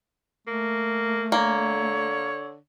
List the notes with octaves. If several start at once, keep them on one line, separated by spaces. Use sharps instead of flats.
A3 A#3
D3 A#3 C#5